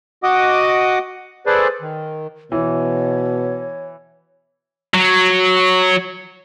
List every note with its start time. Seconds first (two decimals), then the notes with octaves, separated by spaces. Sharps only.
0.23 F#4 D#5 F#5 D6 D#6
1.46 G#4 A4 B4 C5 D5
1.82 D#3
2.52 B2 E3 C#5
4.94 F#3